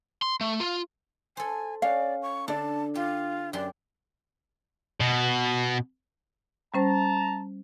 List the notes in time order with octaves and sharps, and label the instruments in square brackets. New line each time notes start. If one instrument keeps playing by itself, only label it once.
[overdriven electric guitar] C6
A3
F4
[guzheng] A4 C5 [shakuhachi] G#5
[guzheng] C#4 [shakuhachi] D5 [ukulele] F5
[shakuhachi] C#6
[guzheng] D3 [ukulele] D4 D5 [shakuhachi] A5
[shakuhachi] F4 [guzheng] G4
[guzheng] F#2 G4 C6 [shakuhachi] D5
[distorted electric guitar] B2
[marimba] G3 C#4 C5 [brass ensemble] A5 A#5